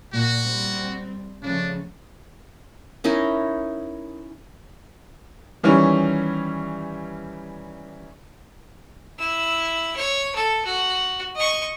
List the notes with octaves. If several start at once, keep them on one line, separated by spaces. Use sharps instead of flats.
A#2 F#4
G3 C4
C#3 F3 A3 D4
C#4 D#4 E4 A#4
D#3 E3 G3 C#4
E4 E6
C#5
A4
F#4
D#5 C#6